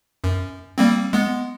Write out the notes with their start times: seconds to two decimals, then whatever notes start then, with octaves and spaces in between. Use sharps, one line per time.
0.24 F#2
0.78 G3 A#3 C4
1.13 G#3 B3